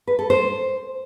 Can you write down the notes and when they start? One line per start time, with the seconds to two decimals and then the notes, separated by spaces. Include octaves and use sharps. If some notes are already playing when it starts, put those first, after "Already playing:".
0.08 B4
0.19 A4
0.30 C5